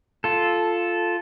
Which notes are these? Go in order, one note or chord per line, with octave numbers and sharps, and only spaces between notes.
F4 A4